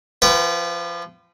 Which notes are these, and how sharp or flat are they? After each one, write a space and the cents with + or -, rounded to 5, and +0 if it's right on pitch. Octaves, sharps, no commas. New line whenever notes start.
F3 -30 B4 +0 G5 -45